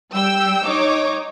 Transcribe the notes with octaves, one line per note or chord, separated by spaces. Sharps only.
G3 G5 E6
D#4 C#5 D6